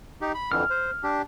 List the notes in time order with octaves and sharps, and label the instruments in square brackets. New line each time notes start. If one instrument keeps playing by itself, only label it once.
[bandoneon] D#4 G4
B5
[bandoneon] F2 D3 E3 [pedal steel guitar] F6
[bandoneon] C5
D4 G4